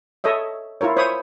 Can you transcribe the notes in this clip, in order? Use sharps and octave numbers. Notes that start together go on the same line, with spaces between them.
A4 C#5 D#5 E5
E4 F4 A#4 C#5
C5 C#5 B5 D#6